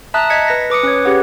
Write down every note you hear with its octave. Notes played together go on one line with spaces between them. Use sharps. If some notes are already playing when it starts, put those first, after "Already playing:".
E5 A5 A#5 D#6 F#6
D#5 G#6 B6 C#7
B4 A#6
B4 D6 D#6 C#7
C#4 C#5
C#4 G4 G#4 B4 F#5